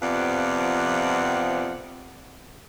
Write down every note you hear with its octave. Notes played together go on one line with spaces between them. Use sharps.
F2 C3 F3 B3 D5 F#5